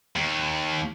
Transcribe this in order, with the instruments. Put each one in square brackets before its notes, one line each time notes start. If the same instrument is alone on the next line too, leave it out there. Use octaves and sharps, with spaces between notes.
[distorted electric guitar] D#2